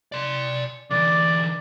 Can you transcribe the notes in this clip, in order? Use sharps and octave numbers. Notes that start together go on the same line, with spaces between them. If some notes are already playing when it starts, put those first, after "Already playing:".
D5 C6
D3 E3 D5